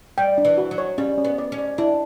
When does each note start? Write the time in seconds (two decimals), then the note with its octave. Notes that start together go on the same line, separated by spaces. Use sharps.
0.18 G3 G5
0.38 D4
0.45 E3
0.58 F#4
0.71 F#3
0.78 C#5
0.98 G3 C#4
1.18 C#4
1.25 B3
1.38 D5
1.52 C#4
1.58 D5
1.78 D4 E4